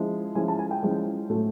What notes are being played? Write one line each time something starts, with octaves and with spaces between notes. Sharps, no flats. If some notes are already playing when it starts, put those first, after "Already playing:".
Already playing: F3 G#3 C#4 E4
F3 G#3 C#4 E4 G#5
A5
G#5
G5
F3 G#3 C#4 E4
A2 F#3 A3